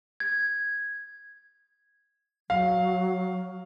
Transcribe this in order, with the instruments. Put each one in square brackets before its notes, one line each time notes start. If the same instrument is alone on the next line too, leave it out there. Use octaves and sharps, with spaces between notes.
[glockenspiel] G#6
[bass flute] F#3 [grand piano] F5